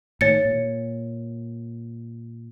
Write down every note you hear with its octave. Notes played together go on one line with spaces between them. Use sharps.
A2 D#3 C#5 A6 C#7
A#2